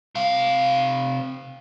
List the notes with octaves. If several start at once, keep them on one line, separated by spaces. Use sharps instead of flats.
C3 F5